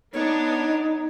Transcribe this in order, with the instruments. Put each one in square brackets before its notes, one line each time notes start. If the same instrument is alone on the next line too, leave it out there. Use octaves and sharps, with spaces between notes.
[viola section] B3 D4 [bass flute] D#4 [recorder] C#5